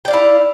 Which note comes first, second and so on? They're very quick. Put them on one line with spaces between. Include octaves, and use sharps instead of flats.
G5 D5 F5 E4